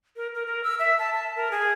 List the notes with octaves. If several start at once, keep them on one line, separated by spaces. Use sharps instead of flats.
A#4
A#4
A#4
E6
E5
A5
A5
A#4
G#4